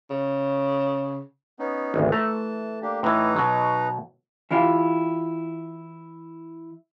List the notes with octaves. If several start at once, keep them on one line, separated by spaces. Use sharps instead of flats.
C#3
B3 C#4 D#4
G#1 D2
E3 A3 A5 A#5
A#3 D4 G4
A2 E3 D#4 B4 A#5
B2 F#3
E3 E4 F4 G4